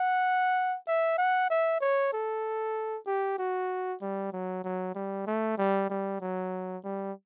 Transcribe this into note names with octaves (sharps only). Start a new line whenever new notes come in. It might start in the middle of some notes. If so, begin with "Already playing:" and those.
Already playing: F#5
E5
F#5
E5
C#5
A4
G4
F#4
G3
F#3
F#3
G3
A3
G3
G3
F#3
G3